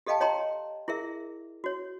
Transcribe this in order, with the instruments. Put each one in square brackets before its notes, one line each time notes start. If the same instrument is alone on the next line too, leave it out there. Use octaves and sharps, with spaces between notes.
[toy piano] G4 A4 D#5 F5 G5 A5
C#5 D#5 G5 A5 A#5 C6
E4 G#4 A#4 E5
F#4 C#5